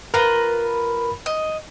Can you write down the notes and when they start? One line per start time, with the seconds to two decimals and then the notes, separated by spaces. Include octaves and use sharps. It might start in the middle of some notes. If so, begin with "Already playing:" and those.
0.14 F4 A#4 B4 A#5
1.26 D#5